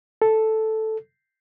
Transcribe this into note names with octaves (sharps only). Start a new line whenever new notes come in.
A4